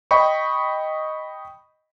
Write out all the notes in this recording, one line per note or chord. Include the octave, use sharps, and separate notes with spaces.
D#5 G5 B5 C#6